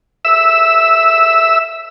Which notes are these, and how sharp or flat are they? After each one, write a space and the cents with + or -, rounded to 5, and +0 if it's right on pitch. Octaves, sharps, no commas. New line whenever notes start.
E5 +0 E6 +0